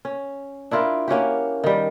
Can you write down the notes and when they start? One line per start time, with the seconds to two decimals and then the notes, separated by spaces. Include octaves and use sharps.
0.05 C#4
0.71 D4 E4 F4 A#4
1.08 A#3 C#4 F#4 G4
1.64 D#3 G3